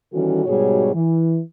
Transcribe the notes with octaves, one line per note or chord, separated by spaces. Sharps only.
D#3 E3 G3 C#4 F#4 A4
G#2 B2 G3 F#4 G#4 C#5
E3